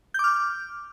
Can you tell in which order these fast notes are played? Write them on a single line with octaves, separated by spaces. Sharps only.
G6 D6 F6